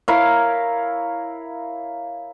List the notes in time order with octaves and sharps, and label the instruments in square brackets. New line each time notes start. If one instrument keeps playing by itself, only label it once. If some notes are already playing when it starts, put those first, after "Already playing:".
[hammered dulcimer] E4 A#4 C#5 F5